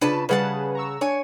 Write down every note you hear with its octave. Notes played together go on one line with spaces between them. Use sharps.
C#3 D4 F4 B4 A5
C#3 G3 G#4 B4 F#5 A5
A#5 C#6 E6
D4 C#5 G#5